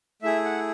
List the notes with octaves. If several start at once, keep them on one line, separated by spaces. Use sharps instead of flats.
A3 E4 G#4 E5
F#5